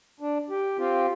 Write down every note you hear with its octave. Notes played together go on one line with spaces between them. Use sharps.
D4
G4
C4 F4 G4